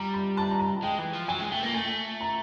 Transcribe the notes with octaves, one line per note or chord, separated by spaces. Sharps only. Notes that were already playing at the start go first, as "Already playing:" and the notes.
Already playing: G3 A#5
B5
A5
A#5
A5
G#3 G5
E3
F3
F#3 G#5
G#3
A3 G5
A#3
A3 G#5
A#5